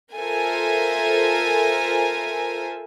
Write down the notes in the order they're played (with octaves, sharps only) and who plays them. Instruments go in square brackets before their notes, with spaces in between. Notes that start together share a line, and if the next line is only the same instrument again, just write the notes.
[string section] F4 A4 A#4 C5 E5 G#5